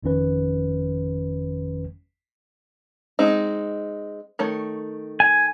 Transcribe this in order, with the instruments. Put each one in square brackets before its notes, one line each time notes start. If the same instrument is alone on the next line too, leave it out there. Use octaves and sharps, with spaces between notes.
[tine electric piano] G1 F2 D#3 C#4 B4
[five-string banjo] G#3 C4 D#4
D#3 A3 C#5
[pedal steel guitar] G#5